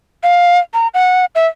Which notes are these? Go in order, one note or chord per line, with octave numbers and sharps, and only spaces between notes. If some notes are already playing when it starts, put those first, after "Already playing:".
F5
A#5
F#5
E5